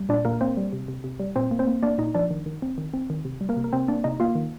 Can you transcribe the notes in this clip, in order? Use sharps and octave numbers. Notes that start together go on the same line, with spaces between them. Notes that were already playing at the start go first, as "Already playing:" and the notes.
Already playing: G3
A#2 D4 D5
A#2 A#3 A#4
A#3 C4 C5
G3
C3
C3
C3
G3
A#2 C4 C5
A#3
C4 C5
A#3
A#3 D4 D5
A#2 D#4 D#5
F3 D4 D5
D#3
D#3
C4
D#3
C4
D#3
C3
G3
A#3 A#4
C3
A#4
C3 C4 C5
A#3 D4 D5
C3 D#4 D#5
A#3 F4 F5
D#3